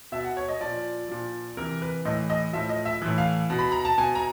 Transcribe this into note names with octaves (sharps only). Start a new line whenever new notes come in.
B2 E5
F#5
C#5
D#5
A#2 F3 D5
A#2 F3
C3 E3 A#4
B4
A2 E3 D#5
D#5
A2 F3 E5
D#5
E5
A2 E3
F5
B2
B5
A#5
A5
B2 G#5
A#5